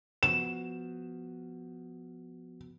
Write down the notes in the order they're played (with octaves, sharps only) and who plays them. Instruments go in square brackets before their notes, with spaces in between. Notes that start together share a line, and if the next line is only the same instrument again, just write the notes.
[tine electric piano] F3 B3 F#4 [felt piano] E7